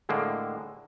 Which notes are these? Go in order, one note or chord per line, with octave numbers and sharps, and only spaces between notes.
A2 D3 G#3 A#3